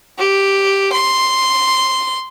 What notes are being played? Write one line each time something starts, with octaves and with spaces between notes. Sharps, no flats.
G4
C6